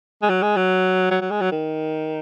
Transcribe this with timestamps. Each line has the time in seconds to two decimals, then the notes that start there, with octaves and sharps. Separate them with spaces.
0.22 G#3
0.29 F#3
0.43 G#3
0.57 F#3
1.11 F#3
1.21 F#3
1.31 G#3
1.41 F#3
1.52 D#3